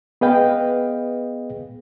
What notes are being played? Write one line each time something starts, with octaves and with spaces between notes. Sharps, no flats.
B3 G#4 B4 D#5 F5 G5